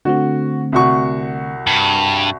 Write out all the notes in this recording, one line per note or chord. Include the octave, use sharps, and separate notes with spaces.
D3 A3 C4 F#4
C2 F#4 C#6
G2